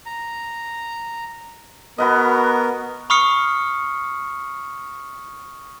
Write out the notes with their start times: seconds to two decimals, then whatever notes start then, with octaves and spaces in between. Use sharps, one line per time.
0.06 A#5
1.98 B3 F#4 A#4 B4 D#5
3.10 B5 C#6 D#6 F6 C7 C#7